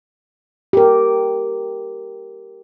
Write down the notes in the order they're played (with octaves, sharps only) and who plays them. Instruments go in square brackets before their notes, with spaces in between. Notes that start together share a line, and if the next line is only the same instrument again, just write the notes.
[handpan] G4 A#4